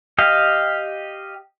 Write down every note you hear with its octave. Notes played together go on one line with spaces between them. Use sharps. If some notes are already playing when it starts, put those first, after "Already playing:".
G4 D#5 F5